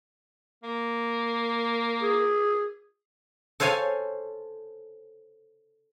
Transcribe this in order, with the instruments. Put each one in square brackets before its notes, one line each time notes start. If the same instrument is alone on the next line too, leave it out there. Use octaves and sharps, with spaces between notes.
[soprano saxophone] A#3
[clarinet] G#4
[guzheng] A4 C5 C#5 F5 G#5